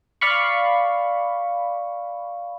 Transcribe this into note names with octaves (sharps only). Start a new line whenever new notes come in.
D5 F5 B5 C#6